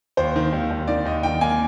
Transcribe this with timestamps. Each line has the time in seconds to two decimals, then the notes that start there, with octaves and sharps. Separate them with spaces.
0.17 D#2 C5
0.36 D#3
0.52 D#2
0.70 D#2
0.88 D#3 D5
1.05 D#2 D#5
1.23 D#3 G5
1.41 A#3 G#5